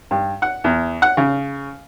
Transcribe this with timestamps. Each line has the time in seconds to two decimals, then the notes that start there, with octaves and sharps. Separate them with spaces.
0.11 G2
0.42 F#5
0.64 E2
1.02 F#5
1.17 C#3